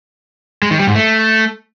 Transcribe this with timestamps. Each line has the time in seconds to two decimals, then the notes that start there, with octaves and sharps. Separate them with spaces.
0.62 G#3
0.71 D#3
0.79 G3
0.87 G#2
0.96 A3